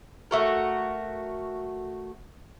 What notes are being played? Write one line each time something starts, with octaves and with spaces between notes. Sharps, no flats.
A3 F#4 A#4